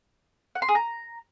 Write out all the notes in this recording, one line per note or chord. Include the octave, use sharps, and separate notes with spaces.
F#5
C6
G#4
A#5